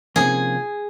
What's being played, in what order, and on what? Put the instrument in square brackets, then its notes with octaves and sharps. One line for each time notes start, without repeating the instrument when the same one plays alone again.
[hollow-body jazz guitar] C3 F3 A#3 C#4 [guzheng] G#4